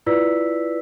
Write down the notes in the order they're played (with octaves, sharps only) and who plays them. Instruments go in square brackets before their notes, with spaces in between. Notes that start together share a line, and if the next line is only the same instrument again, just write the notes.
[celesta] E4 F4 B4 D5 E6 B6